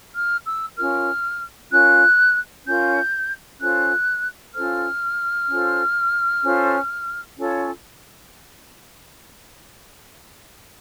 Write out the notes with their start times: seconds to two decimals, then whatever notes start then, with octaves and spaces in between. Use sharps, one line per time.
0.14 F6
0.45 E6
0.76 C#4 F4 A#4 F6
1.71 C#4 F4 A#4 F#6
2.65 C#4 F4 A#4 G6
3.59 C#4 F4 A4 C5 F#6
4.55 C#4 F4 A4 C5 F6
5.49 C#4 F4 A4 C5
6.43 C#4 F4 A4 C5
7.38 C#4 F4 A4 C#5